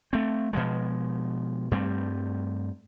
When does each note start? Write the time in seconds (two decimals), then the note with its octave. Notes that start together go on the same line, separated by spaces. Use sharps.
0.13 A3 C4
0.53 B2 F3 G#3
1.71 G2 G3 A3 C4